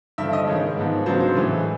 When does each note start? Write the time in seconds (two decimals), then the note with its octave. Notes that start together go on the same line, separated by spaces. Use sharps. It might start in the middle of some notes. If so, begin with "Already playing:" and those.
0.18 G2 D3 F3 E5
0.33 D#5
0.47 G#2 D#3 G#3 C#5
0.77 G#2 F3 G#3 B3
1.06 C#3 F#3 B3 D4 C5
1.20 C5
1.35 A2 E3 G#3